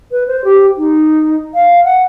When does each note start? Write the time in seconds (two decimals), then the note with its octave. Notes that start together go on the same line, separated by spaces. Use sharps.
0.11 B4
0.28 C5
0.44 G4
0.78 D#4
1.54 F5
1.84 F#5